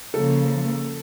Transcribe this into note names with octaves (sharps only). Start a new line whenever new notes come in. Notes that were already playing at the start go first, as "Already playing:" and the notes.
C#3 F3 A#3 A4